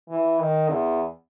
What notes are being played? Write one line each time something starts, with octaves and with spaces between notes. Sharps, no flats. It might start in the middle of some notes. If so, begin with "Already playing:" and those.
E3
D#3
E2